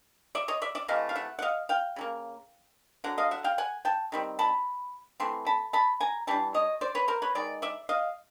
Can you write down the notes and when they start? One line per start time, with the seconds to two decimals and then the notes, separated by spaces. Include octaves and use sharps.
0.35 D5 E5
0.48 C#5 D#5
0.62 D5 E5
0.75 D5 E5
0.88 C3 E3 A3 D#5 F5
1.09 F5
1.16 E5 F#5
1.39 F#5
1.42 D#5 F5
1.69 F5 G5
1.96 C#3 F#3 A#3
3.04 D3 F#3 F#5
3.18 D#5 F5
3.31 E5 F#5
3.44 F5 G5
3.58 F#5 G#5
3.85 G5 A5
4.12 D#3 G3 C4
4.39 A5 B5
5.20 E3 A3 C4 C6
5.46 A5 B5
5.73 A5 B5
6.00 G#5 A#5
6.27 E3 G3 D4 A5
6.54 C#5 D#5
6.81 C5 D5
6.95 B4 C#5
7.08 A#4 C5
7.22 B4 C#5
7.35 D#3 G#3 D5
7.62 D5 E5
7.89 D#5 F5